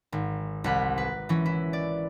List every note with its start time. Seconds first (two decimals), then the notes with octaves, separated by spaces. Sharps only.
0.12 G#1
0.64 C2 F#5 B5
0.98 B4
1.29 E3 C#4
1.46 E4
1.73 D5